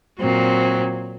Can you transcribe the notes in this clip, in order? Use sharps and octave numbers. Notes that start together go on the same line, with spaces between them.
A#2 F#3 C4